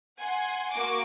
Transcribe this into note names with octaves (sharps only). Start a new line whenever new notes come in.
F#5 G#5 C6
A#3 F#4 C#6 D6